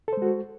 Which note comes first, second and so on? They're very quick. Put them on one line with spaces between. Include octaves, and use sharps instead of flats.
A4 C5 G#3 F#4